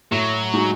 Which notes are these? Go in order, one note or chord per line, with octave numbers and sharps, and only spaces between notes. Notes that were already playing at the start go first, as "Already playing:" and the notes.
A2 F#3
G#3 D#4 F#4